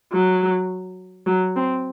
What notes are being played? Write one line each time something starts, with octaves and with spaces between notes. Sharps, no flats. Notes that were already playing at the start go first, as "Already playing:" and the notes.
F#3
F#3
C4